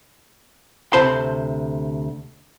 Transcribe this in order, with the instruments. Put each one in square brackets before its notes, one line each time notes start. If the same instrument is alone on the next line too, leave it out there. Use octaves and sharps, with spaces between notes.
[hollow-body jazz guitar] D2 C3 C5 A5 B5 C6